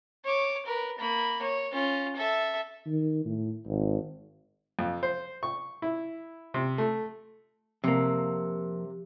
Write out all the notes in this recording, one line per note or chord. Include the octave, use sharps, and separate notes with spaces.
C#5 D6
A#4 B4
A#3 B5
C#5
C#4 F4
A4 E5
D#3
A2
G#1
F2
C5
C#6
E4
C3
A3
F2 C3 A#3